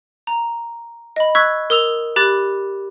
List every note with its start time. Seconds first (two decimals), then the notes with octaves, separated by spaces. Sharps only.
0.27 A#5
1.16 D#5 B5
1.35 C#6 E6 F#6 G#6 B6
1.70 A#4 D#6 E6 F7
2.16 G4 B5 D6 F#6 A6